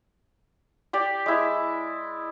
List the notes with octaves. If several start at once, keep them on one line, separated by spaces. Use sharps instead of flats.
G4 D5
G#3 E4